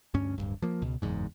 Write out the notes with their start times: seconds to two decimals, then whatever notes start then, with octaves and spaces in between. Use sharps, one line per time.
0.14 D2 G2 C#4
0.38 D1 C#2 G2
0.62 F3 A#3
0.82 C#2 B2
1.02 F#1 E2 G#2